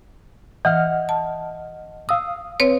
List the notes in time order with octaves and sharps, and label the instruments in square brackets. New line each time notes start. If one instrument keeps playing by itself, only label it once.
[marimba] E3 [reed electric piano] D#5 F#5 F6
[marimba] A5
[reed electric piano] F5 D#6 [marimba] E6
[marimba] C4 B4 C#5